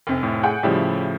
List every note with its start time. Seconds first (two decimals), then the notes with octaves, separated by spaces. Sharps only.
0.07 F1 C3
0.23 A2
0.43 G#4 F#5 G5
0.63 A2 C#3 F3 G3 E4 G4